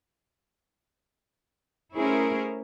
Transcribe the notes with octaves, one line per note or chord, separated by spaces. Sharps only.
A3 C#4 E4 G#4 A#4 C5